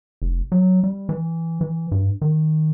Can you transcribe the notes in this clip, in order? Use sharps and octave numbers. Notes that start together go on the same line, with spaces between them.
F1
F#3
G3
E3
E3
G2
D#3